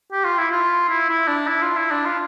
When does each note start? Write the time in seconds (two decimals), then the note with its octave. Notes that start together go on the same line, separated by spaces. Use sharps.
0.12 G4
0.25 F4
0.38 E4
0.51 F4
0.89 E4
1.09 E4
1.28 D4
1.47 E4
1.62 F4
1.76 E4
1.91 D4
2.05 F4